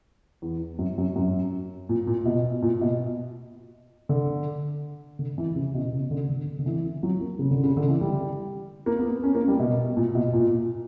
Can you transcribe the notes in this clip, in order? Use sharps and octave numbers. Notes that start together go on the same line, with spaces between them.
E2
F#2
F#2
F#2
A#2
A#2
B2
A#2
B2
D3
D3
E3
C#3
B2
C#3
D3
D3
D3
E3
F#3
A#3
C#3
D3
C#3
D3
E3
G3
A#3
B3
B3
C#4
A#3
G3
B2
A#2
B2
A#2